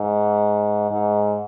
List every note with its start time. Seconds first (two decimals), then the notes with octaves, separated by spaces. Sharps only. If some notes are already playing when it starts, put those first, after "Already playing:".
Already playing: G#2
0.91 G#2